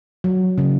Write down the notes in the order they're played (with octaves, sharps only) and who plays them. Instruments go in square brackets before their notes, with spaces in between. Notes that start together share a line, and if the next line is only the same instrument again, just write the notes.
[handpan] F#3
C#3